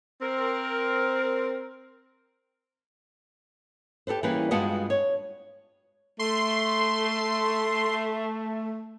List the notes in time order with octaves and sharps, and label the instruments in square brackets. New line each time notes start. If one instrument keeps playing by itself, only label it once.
[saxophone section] C4 A#4
[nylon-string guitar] G4 A4 B4 C5
E3 G3 A#3 C#4 G#4 B4
G2 G#3 B3 F4 F#4 D#5
C#5
[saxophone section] A3 [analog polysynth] C6